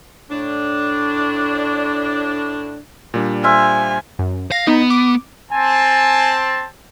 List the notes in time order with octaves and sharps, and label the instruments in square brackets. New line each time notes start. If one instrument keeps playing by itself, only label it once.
[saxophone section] A2 D4
[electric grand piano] A#2 G3 D4
[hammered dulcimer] C5 E5 F5 [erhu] G#5
[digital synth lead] F#2
[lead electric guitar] F5 [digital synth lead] A#6
[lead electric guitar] B3 [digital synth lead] D#4
[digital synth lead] D6
[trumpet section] C4 A5 [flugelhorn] G#5